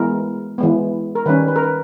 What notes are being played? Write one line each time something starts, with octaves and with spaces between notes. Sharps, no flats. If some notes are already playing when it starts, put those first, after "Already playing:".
Already playing: E3 G#3 B3 A#4
E3 G#3 B3
A#4
D#3 G3 C#4 B4
B4
A#4
B4